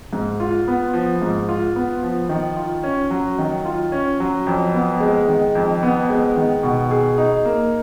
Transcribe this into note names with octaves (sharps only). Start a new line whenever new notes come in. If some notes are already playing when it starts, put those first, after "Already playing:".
G#2
F4
B3
F3
G#2
F4
B3
F3
D#3
F4
C#4
F#3
D#3
F4
C#4
F#3
F2
B3
G#3
D#3
F2
B3
G#3
D#3
B2
G#4
D#4
A#3